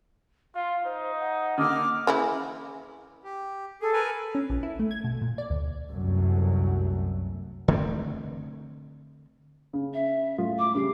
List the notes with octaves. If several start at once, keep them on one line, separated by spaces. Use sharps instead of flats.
F4 F5
D#4 C5
F#5
D3 D#3 A#3 D#5 D6 F6
C#3 E3 E4
G4
G#4 A4
A#4 B4 G#5
C#4
A#1
E4
A3
G#6
B2
A#2
D5
D2
G1 C2 F#2 F#3 A3
D3 A3 C4
C#3
E5
A2 F4
D6
C#3 G3 F5